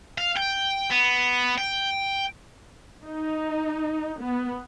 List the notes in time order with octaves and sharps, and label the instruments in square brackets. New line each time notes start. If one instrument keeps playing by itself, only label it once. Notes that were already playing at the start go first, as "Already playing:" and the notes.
[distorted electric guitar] F5
G5
B3
G5
[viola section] D#4
B3